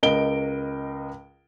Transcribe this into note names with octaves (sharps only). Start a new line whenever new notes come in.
C#2 A#4 D#5 D7 G7